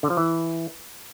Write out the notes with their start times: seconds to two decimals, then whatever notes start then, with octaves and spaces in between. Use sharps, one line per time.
0.03 D3
0.10 F3
0.17 E3